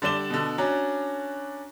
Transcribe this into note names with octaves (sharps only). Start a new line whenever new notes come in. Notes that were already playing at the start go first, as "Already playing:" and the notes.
D3 G3 D5 E7 G7
B2 D3
C#4 D4 F#4 A#5